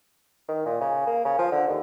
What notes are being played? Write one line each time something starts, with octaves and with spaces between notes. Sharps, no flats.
D#3
A#2
C#3
A#3
C#3
F3
D3
D#2